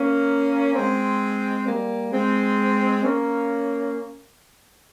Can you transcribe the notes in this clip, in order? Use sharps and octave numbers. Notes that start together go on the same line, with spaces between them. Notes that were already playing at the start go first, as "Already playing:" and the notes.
Already playing: A#3 C#4
G#3 C4
G3 A#3
G#3 C4
A#3 C#4